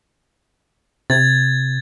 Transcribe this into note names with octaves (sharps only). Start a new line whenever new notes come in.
C3 G#6 A6